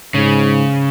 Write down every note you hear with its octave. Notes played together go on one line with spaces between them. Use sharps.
G#2 C#3